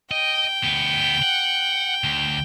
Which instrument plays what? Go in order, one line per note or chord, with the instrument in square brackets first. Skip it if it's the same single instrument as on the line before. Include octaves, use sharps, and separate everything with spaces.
[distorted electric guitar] D#5 [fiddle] G5
[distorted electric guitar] D2 B3
F#5
D2